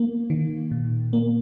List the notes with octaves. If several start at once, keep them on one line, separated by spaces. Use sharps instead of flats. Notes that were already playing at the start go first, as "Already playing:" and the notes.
Already playing: A#3
D#3
A#2
A#3